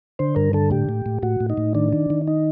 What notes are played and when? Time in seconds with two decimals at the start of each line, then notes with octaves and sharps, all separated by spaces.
0.19 D3 C5
0.36 G2 A#4
0.53 D3 A4
0.71 A2 G4
0.89 A2
1.06 A2
1.23 A2 F#4
1.40 A2
1.50 D#4
1.57 A2
1.75 D#3 D4
1.93 D#3
2.10 D#3
2.27 D#4